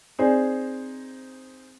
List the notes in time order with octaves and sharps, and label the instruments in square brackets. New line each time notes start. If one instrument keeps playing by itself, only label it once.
[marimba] C4 D5 G#5 [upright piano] D#4 G#4 C5